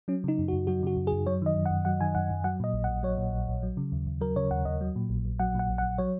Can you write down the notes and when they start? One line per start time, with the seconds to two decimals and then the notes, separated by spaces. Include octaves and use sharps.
0.08 F#3 C#4
0.24 C#3 D#4
0.39 F#2
0.48 F#4
0.53 F#2
0.67 F#3 F#4
0.83 C#3 F#4
0.97 F#2
1.07 G#4
1.12 F#2
1.26 F#3 C#5
1.42 D#3 D#5
1.55 F#2
1.66 F#5
1.71 F#2
1.85 F#3 F#5
2.01 D#3 G#5
2.15 F#2 F#5
2.30 F#2
2.44 F#3 F#5
2.60 A#2 D#5
2.73 A#1
2.84 F#5
2.89 A#1
3.03 F#3 C#5
3.18 A#2
3.33 A#1
3.48 A#1
3.63 F#3
3.77 C#3
3.92 D#2
4.07 D#2
4.21 F#3 A#4
4.36 C#3 C#5
4.51 D#2 F#5
4.65 D#2 D#5
4.81 F#3
4.96 A#2
5.09 A#1
5.25 A#1
5.39 F#3 F#5
5.55 A#2 F#5
5.70 A#1
5.78 F#5
5.83 A#1
5.98 F#3 C#5